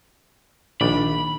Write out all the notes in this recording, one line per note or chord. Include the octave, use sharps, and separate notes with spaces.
A#1 D#3 D5 B5